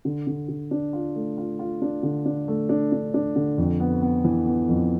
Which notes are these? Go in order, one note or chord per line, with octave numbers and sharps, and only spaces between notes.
D3
D3
D3
D4
F4
A3
F4
F4
D4
D3
D4
A3
D4
D4
D4
D3
F2
B3
B3
E3
B3
F2